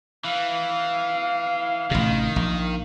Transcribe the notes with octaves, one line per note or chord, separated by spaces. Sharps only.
E3 F5
A1 C3 D#3
A#1